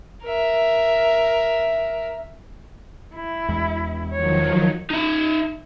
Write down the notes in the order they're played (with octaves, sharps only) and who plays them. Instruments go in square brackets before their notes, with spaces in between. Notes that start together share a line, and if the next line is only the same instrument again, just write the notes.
[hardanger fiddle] A#4 E5
[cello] E4
[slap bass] E2 G#3
[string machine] D#3 F3 F#3 [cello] C#5
[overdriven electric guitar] D#4 E5